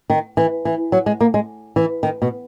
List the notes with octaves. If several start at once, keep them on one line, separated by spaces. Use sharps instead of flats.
D#3
E3
E3
F#3
G#3
A#3
G#3
E3
D#3
B2